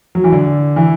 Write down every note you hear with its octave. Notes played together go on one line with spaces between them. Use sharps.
F#3
E3
D3
E3